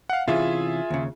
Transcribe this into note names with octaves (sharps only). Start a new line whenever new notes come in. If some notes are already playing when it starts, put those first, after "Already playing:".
F5 F#5
C3 E3 C#4 F4 G#4 E5
D#2 C#3